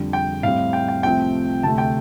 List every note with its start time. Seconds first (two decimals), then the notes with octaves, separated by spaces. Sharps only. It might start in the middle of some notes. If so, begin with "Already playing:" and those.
Already playing: F2 D3 G3
0.13 G5
0.43 A2 G3 C4 F5
0.73 G5
0.88 G5
1.03 C2 C3 F3 A3 C4 G5
1.63 D2 C3 A3 A5
1.78 G5